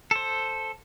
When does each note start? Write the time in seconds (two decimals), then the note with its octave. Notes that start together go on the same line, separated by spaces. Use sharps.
0.11 A4 C5